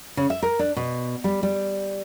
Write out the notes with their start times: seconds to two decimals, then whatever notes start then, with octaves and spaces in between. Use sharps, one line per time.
0.17 C#3
0.30 E5
0.43 A#4
0.59 D4
0.77 B2
1.24 G3
1.43 G3